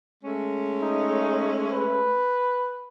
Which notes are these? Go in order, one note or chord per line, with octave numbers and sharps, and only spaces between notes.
G#3 A3 C#4
D#4
B4